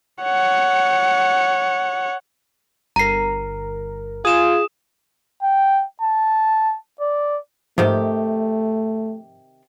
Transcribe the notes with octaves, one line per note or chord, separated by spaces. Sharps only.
C#5 F#5
G1 A#4 A#5 C7
F4 G#4 D#6 E7
G5
A5
D5
G#2 C3 D#3 F3 A3 G4